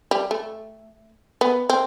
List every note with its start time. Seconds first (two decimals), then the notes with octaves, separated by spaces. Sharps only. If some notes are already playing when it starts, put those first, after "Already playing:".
0.11 G3
0.31 A3
1.41 B3
1.70 C4